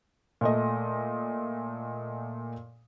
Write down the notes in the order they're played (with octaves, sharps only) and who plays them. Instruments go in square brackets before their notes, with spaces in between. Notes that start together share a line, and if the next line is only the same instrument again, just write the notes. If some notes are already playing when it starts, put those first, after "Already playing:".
[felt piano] A#2 A3 D#5